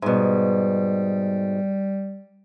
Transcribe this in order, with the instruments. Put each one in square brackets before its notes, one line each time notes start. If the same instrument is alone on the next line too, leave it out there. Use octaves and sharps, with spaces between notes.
[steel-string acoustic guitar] G#2 B2 [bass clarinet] G3